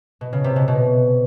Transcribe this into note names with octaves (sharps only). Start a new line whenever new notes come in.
B2
C#3
C3
B2
B2